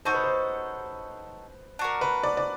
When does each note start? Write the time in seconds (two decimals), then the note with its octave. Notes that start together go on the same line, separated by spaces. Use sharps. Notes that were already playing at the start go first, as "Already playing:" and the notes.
0.05 D#4 F#4 A4 C5 C#5
0.14 B4
0.24 C5
1.79 D4 F#4 A#4
2.01 B4
2.23 D5
2.37 D5